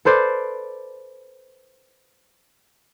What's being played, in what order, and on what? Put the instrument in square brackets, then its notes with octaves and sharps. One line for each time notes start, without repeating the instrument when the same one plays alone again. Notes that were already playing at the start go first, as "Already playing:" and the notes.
[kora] A4 B4 C5 D5